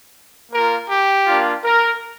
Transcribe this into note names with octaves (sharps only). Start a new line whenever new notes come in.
A#3 F4 A#4
G4
A#3 D4 F4
A#4